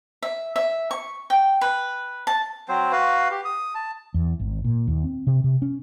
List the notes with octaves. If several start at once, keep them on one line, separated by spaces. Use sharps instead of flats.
E5
E5
C#6
G5
B4
A5
F#3 C4 C5
F#4 B4 F5
G4
D#6
A5
E2
G#1
A#2
D#2
C4
C3
C3
C#4